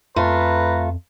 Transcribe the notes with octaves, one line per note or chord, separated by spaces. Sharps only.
F2 A3 F4 B4 A#5